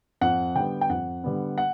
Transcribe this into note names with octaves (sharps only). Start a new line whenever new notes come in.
F2 F#5
D3 G3 B3 G5
G5
F2 F#5
D3 G3 B3
F#5